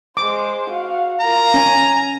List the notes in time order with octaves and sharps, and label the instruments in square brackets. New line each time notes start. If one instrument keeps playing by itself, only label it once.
[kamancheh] G#3 C5 [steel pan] D6
[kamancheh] F#4 F5
[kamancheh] F4 A#4 [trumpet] A#5
[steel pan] C#4 [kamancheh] G#5